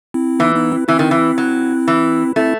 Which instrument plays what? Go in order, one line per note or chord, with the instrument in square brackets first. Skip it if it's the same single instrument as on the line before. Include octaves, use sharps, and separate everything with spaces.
[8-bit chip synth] C4 E4
[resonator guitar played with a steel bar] E3 [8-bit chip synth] B3 D#4
[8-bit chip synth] B3 D#4
C4 E4
[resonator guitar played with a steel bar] E3 [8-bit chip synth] C4 E4
[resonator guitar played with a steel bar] D#3
E3
F#3
E3
[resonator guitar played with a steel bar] A3 [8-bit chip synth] C4 E4